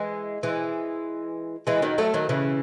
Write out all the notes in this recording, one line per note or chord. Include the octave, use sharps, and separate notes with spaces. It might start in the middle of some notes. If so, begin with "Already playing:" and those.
Already playing: E3 G#3
E3 G#3
E3 G#3
D#3 F#3
F#3 A3
D#3 F#3
C#3 E3